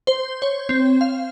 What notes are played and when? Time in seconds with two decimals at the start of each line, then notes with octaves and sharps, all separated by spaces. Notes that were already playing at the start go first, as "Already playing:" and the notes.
0.07 C5
0.42 C#5
0.69 C4
1.01 F5